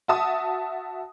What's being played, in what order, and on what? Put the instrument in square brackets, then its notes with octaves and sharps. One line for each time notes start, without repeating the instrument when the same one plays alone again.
[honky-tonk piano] F#4 E5 A5 D#6